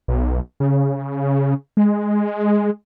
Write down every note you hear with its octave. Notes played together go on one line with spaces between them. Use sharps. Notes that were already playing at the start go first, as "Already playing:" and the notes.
B1
C#3
G#3